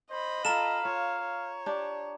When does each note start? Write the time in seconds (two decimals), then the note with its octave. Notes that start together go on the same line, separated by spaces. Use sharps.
0.10 C5 D#5 B5
0.45 F4 A4 F5 A#5 E7
0.85 F4 C#5
1.21 C#5
1.66 D4 G4